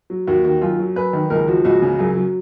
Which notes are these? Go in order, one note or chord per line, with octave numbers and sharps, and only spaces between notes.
F#3
D#2 F#4
D#3 F#4
F#2 F4
F#3
F#2 B4
D#3
C#2 A#4
F3 F#4
C#2 F#4
C#3
F#2 G#4
F#3